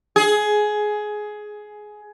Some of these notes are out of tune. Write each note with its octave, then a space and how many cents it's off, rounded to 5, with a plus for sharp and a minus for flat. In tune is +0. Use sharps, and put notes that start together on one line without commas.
G#4 +15